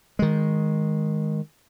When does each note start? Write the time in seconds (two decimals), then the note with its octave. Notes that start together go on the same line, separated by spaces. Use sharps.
0.19 D#3 G#3